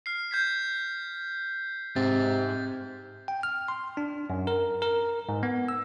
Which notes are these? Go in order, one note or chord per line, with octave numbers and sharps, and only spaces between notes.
F6 C7
G6 G#6 B6
G#2 C3 A6
G5
F6
C6
D4
F#2
A#4
A#4
G#2
B3
E6